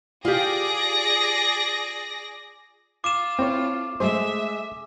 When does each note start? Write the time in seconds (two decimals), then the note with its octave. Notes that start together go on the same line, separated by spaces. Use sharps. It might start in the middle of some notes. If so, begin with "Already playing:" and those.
0.25 F4 G4 G#4 D5 A#6
3.04 F4 D6 E7
3.39 C4 E4 A4 C#5
4.00 G#3 A3 G#4 C5 E5